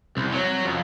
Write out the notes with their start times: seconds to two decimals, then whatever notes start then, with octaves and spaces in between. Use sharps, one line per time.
0.17 C2
0.32 F#3
0.65 F2